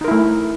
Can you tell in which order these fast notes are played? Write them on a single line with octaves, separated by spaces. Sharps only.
D#4 A#4 E4 A3